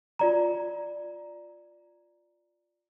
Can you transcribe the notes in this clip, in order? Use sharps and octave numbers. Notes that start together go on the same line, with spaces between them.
F4 D5 A#5